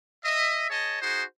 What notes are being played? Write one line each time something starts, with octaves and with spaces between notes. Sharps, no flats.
D#5 E5
G#4 C#5 D#5 A5
D#4 F#4 G#4 C5